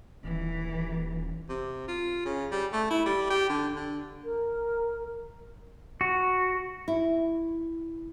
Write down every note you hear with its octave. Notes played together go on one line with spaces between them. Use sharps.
D#1 E3
C3
F4
C#3
G3
A3
E4
G3
G4
D3
D3
A#4
F#4
E4